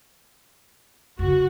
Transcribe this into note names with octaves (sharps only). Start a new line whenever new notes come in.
F#2 C#3 F#4